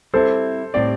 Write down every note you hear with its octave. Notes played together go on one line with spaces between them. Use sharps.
G3 C4 E4 A4 C5
A2 G3 C4 G4 D5